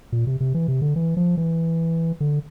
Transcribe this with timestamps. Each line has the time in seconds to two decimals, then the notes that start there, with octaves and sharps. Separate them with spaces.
0.12 A#2
0.27 C3
0.40 C3
0.54 E3
0.68 C3
0.82 D3
0.96 E3
1.17 F3
1.37 E3
2.20 D3